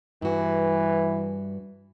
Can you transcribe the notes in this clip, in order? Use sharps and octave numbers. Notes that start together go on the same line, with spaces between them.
G2 E3 F#4